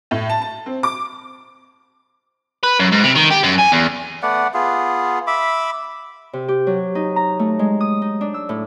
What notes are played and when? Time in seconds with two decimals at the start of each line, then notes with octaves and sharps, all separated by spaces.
0.11 A2
0.30 A5
0.42 A5
0.66 C4
0.83 D6
2.64 B4
2.80 F#2
2.92 G#2
3.04 C3
3.16 D#3
3.31 G4
3.44 F#2
3.59 G#5
3.73 E2
4.23 A3 B3 D5 F#5
4.54 B3 F4 G#4
5.27 E5 B5 D6
6.33 C3
6.48 G4
6.67 F#3
6.95 D#4
7.16 A#5
7.39 A3
7.59 G#3
7.80 D#6
8.02 D#4
8.21 D4
8.34 E6
8.49 A2